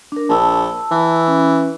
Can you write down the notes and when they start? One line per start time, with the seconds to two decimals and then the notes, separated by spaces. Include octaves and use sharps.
0.12 D4 A#4
0.29 A#1 A5 E6
0.91 E3
1.28 C#4